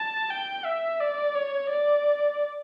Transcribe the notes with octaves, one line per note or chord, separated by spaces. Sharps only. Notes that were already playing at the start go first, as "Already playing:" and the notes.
Already playing: A5
G5
E5
D5
C#5
D5